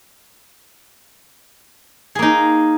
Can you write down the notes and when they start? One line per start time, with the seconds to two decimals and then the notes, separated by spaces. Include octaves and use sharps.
2.15 G#4
2.19 A#3
2.22 D#4